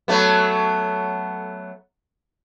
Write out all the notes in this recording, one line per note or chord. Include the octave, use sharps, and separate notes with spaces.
F#3 A3 B3